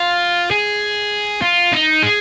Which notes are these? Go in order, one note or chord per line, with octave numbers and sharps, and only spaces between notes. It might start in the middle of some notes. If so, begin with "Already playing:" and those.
Already playing: F4
G#4
F4
D#4
G#4